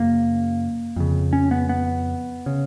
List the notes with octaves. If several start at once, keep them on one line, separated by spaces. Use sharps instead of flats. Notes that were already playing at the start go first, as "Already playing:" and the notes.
Already playing: F#2 C#3 A#3
F2 C#3
C#4
B3
B3
C#3